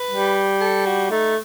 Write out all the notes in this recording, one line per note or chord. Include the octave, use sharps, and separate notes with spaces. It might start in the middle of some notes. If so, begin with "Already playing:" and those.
Already playing: B4
G3
A4
F#4
A3 D#4